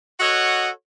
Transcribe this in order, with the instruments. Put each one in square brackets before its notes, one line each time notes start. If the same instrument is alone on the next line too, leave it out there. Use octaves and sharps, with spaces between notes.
[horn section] F#4 A4 C#5 D#5 F#5